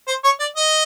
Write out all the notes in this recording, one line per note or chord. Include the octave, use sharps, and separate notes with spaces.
C5
C#5
D5
D#5